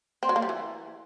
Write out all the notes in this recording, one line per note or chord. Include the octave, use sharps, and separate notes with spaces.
C4
F#3
A#3
G3
E3